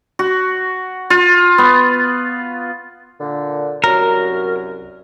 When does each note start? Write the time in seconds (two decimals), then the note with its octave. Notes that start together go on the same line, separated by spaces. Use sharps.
0.19 F#4
1.10 F4
1.58 B3
3.20 A#2 D3
3.84 C2 F#2 F#3 A#4